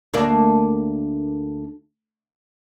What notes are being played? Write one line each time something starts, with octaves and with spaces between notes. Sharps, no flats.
D2 A#3 D4